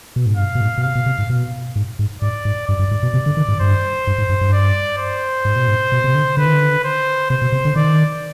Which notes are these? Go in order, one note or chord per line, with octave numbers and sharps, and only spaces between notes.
B2
G#2
G2 F5
B2
G#2
B2
C3 F5
B2
C3
G#2
B2
G#2
G#2
G#2 D5
G#2
G2 D5
G2
G#2
B2
C3
D3
D#3
G#2
G2 C5
G2
G#2
G2
G2
D5
C5
G#2
B2
G#2
B2
C3
D3
D3 B4
D#3
D3
C5
C3 C5
B2
C3
D3
D#3 D5